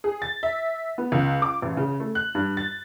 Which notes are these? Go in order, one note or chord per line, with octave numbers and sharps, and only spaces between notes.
G#4
A6
E5
B3
C#2
D6
A1
C#3
A3
F#6
G2
A6